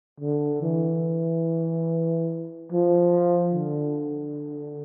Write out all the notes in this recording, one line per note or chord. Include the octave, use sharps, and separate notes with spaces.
D3
E3
F3
D3